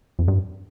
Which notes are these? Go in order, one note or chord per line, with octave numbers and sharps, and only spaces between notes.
F2
G2